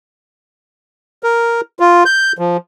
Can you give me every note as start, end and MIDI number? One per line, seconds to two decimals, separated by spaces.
1.23 1.61 70
1.80 2.04 65
2.06 2.32 91
2.38 2.57 53